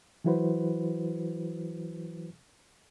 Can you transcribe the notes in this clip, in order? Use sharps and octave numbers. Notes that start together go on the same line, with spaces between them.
E3 F#3 E4 F#4 B4 C5